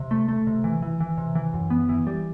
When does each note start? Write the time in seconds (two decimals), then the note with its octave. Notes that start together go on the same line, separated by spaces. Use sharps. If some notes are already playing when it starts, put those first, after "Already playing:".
Already playing: C3
0.11 A3
0.28 A3
0.47 C3
0.64 E3
0.82 E3
1.00 E3
1.18 C3
1.35 E3
1.54 F#2
1.70 B3
1.89 E3
2.07 G3